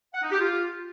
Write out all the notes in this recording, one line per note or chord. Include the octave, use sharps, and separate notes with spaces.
F#5
D#4
G4
F4